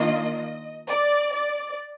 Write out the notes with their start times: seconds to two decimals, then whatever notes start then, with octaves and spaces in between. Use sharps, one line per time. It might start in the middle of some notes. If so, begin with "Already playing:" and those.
Already playing: D#3 A#3 D4 F4 D#5
0.90 D5
1.34 D5